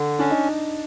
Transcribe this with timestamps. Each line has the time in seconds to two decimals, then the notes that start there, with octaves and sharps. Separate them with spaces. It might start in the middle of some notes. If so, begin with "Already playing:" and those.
Already playing: D3
0.19 C#4 D4
0.31 D#4